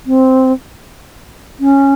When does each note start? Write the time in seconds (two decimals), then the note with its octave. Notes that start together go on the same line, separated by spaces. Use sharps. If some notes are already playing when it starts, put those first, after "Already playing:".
0.06 C4
1.60 C#4